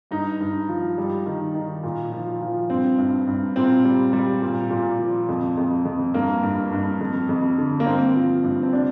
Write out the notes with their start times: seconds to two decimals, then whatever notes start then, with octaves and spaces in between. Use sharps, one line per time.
0.11 G2 D#4
0.40 G2
0.69 F3
0.98 G3
1.26 D#3
1.54 D#3
1.84 A#2
2.12 F3
2.42 F3
2.69 G2 C4
2.98 G2
3.27 G2
3.56 A#2 C4
3.84 G3
4.13 G3
4.42 A#2
4.71 A#2
4.99 F3
5.29 F2
5.57 F2
5.85 F2
6.14 G2 A#3
6.43 G2
6.72 G2
7.01 F2
7.29 F2
7.58 D3
7.80 A#3
7.86 G2 C4
8.16 F3
8.44 G2
8.63 C4
8.73 C3 D4